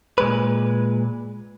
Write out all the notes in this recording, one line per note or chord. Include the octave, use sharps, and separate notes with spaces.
A#2 G#3 B4